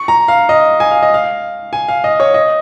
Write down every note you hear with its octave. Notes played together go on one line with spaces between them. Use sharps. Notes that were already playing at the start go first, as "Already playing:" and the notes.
Already playing: C#6
A#5
F5
D#5
G#5
F5
D#5
F5
G#5
F5
D#5
C#5
D#5